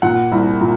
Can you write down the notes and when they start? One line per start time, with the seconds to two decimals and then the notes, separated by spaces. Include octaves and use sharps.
0.02 A#2 F#5
0.32 C2
0.61 A#2